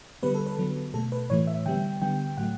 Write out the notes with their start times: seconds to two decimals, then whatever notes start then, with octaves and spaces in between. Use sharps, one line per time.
0.23 D3 G3 B3 B4
0.34 A4
0.47 B4
0.58 D3 F#3 B3
0.94 B2 A3 A4
1.12 B4
1.30 A2 E3 A3 C#5
1.47 E5
1.66 D3 G3 B3 G5
2.02 D3 G3 B3 G5
2.37 A2 F#3 A3 F#5